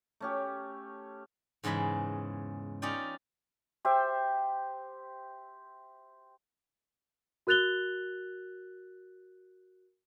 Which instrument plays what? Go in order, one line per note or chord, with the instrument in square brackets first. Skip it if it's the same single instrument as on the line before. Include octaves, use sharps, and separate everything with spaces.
[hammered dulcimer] A3 C#4 G4
[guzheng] E2 G#2 C#3 G#3 B5
C#4 D#4 F4 D5 G5
[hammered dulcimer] G4 C5 E5 G5
[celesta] F#4 A#4 F#6 A6 F7 G7